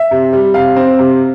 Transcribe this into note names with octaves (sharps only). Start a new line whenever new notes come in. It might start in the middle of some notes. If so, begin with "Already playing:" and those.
Already playing: E5
C3
G3
C3 F5
C4
C3